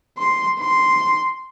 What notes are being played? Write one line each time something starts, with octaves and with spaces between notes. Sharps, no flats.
C6
C6